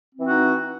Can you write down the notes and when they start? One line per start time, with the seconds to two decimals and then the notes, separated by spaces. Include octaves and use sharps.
0.15 C4
0.20 E3
0.24 D#4
0.28 F#4